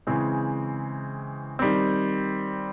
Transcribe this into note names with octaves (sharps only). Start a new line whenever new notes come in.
C#3 E3 G#3 C4
D#3 G3 C4